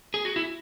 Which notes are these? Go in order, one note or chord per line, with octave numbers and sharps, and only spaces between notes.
G#4
F#4
E4